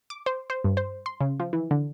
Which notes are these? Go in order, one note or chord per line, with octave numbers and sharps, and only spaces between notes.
D6
C5
C5
G2
C5
C6
C#3
F3
E3
D3